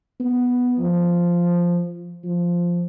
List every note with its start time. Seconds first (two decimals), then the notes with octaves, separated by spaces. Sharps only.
0.20 B3
0.79 F3
2.24 F3